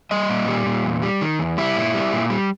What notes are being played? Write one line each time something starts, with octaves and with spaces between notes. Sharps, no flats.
G3 D#5
A#2
G3
A#2
E2
G3
D#3
E2
G3 E4
A#2
G3
A#2
G3